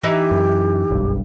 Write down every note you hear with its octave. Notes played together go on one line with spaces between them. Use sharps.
E3 D#4 E4 G4
F#2
F#1 B1 G2